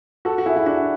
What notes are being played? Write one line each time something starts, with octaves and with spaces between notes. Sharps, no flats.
F#4 A4
F#4
E4 G#4
E4
D4 F#4